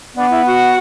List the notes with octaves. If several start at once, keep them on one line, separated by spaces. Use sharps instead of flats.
B3 D4 D5
E4 E5
F#4 F#5